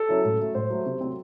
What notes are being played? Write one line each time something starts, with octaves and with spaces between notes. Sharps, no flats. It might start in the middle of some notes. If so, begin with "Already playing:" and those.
Already playing: A4
F#3 C#4 E4
A2
F#3 A3
A2 C5
F#3 A3
C3
F#3 A3 C4